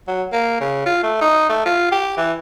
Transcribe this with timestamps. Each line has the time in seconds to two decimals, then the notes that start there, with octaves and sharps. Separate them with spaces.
0.08 F#3
0.32 A#3
0.61 C#3
0.86 F4
1.03 A3
1.21 D#4
1.49 A3
1.66 F4
1.91 G4
2.17 E3